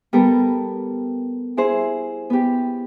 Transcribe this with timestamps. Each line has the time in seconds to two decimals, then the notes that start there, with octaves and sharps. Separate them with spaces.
0.13 G3 B3 A4 A#4
1.57 E4 G#4 C5
2.30 B3 G4